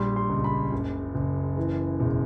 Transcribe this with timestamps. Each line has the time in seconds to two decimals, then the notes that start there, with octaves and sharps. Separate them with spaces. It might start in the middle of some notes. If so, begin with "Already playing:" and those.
Already playing: A#1 G3 C6
0.16 C6
0.30 C#2
0.44 B5
0.72 F#1
1.15 F#1
1.57 E3
2.00 E1